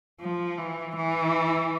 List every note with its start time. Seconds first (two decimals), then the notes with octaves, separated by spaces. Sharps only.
0.20 F3
0.58 E3
0.96 E3